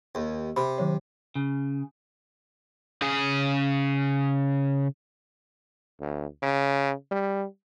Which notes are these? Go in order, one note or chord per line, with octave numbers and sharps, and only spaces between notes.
D#2
C3 B5
D#3 F#3 C#5
C#3
C#3 G#4
D2
C#3
G3